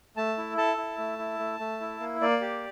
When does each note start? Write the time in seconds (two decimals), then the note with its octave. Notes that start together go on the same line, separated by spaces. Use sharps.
0.17 A3 A5
0.38 E4
0.58 A4 A5
0.78 E4
0.98 A3
1.19 E4
1.39 A3
1.59 A3
1.80 E4
2.00 A#3
2.21 A#3 D5
2.41 G4